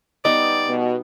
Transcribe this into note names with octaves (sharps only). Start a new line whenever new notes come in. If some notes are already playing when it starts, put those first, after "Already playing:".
G3 B3 D#4 D5 D#5
B2